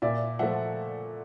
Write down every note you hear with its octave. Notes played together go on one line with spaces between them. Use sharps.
A#2 D5 E5
F3 A3 E5 F#5